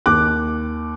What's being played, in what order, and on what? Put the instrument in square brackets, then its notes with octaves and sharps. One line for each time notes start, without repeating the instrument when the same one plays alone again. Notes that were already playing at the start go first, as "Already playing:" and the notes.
[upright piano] D#2 D6 F#6